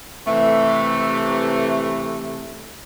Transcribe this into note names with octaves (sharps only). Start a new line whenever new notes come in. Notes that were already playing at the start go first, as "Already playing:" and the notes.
C3 E3 A3